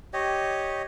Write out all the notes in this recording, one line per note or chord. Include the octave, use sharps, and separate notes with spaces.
G4 C#5 D#5